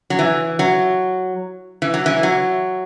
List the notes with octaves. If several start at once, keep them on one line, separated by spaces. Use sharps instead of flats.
F#3
E3
F#3
E3
F#3
E3
F#3